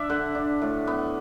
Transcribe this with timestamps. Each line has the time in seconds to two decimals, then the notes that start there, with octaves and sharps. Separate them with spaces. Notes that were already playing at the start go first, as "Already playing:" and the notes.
Already playing: D4 D5 E5
0.09 D3 F#5
0.35 D4
0.62 A2
0.87 B3